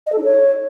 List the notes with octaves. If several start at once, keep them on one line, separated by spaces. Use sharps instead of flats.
D#5
A4
D#4
C#5